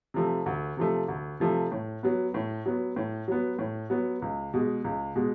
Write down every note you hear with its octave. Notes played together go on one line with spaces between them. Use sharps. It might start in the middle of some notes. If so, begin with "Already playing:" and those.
C3 F3 A3
D2
C3 F3 A3
D2
C3 F3 A3
A2
F#3 B3
A2
F#3 B3
A2
F#3 B3
A2
F#3 B3
C#2
B2 G#3
C#2
B2 G#3